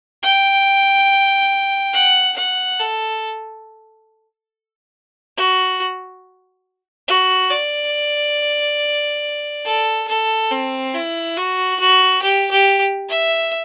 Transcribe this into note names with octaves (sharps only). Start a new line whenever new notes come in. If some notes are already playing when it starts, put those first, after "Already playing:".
G5
F#5
F#5
A4
F#4
F#4
D5
A4
A4
C4
E4
F#4
F#4
G4
G4
E5